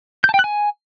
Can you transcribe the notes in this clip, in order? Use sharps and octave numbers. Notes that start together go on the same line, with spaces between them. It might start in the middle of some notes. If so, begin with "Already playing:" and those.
G6
A5
G5
F#6
G#5